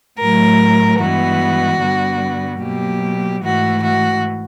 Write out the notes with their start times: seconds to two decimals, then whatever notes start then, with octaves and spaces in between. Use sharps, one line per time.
0.19 A2 F#3 A3 A#4
1.01 G2 E3 G#3 B3 F#4
1.81 G2 D3 G3 B3
2.62 B2 F#3 A#3 G4
3.42 G#2 E3 A3 F#4
3.83 F#4